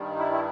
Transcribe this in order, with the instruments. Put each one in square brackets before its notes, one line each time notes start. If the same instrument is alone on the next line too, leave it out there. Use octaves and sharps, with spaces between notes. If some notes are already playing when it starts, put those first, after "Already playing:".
Already playing: [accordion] G2 D#3 G3
E4
E4